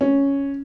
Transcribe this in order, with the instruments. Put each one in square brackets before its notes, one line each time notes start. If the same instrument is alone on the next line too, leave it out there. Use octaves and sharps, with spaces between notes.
[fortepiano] C#4